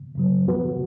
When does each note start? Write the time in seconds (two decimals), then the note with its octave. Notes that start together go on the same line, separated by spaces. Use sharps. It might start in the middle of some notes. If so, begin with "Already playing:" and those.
0.15 F#2 C#3 F#3
0.46 F3 B3 F#4 B4